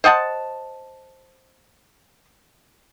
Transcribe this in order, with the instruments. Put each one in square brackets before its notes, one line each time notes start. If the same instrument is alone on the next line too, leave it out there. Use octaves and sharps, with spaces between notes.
[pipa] C5 D#5 F#5 A5